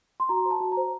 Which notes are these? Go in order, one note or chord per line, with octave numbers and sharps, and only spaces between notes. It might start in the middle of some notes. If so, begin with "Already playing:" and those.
C6
F#4 A#5
C5
A5
F#4
A#5
C5